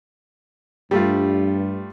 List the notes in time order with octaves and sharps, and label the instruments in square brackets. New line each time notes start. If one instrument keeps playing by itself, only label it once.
[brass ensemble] G2 [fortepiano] G3 A3 F4